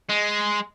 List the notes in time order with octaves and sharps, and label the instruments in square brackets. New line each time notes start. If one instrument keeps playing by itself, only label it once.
[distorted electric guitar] G#3